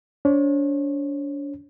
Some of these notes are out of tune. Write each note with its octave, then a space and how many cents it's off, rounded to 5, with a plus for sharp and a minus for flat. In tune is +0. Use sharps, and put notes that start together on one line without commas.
D4 -40 C#5 -40